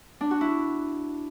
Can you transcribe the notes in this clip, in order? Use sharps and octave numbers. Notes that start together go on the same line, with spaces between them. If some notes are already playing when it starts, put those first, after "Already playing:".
D4
F#4
E4